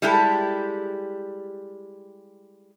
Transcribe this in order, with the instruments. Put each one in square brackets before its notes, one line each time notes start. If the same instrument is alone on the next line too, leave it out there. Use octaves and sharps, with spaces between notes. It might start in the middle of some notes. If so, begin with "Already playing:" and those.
[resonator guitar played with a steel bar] G3 G#3 E4 G4 A4